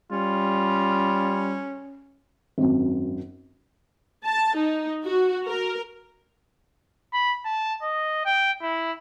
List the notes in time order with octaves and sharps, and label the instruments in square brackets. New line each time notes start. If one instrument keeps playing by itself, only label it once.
[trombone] G3 [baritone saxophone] C#4 [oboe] F4
[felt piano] G#1 F#2
[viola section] A5
D#4
F#4
A#4
[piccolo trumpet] B5
A5
D#5
G5
E4